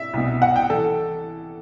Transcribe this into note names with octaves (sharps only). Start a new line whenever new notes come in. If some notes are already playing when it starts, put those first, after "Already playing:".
Already playing: E5
C2 B2
F#5
G5
E3 A4